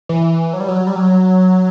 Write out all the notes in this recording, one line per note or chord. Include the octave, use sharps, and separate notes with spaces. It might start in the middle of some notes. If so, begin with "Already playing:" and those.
E3
F#3
G3
F#3
G3
F#3